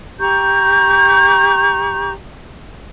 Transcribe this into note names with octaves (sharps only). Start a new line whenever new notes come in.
G4 A#5 C#6 G6